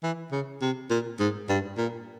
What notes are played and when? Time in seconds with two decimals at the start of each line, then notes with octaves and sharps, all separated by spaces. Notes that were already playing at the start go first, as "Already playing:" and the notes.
0.03 E3
0.31 C#3
0.62 C3
0.90 A#2
1.19 G#2
1.49 G2
1.77 A#2